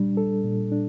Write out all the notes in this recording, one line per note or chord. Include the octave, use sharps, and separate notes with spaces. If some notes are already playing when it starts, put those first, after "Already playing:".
Already playing: A#2 G3 D4
A4
A#2
D4